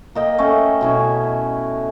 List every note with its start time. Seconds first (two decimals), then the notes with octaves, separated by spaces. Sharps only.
0.15 A#3 D#5 G5
0.38 A3 C#4
0.81 B2 C#4 E4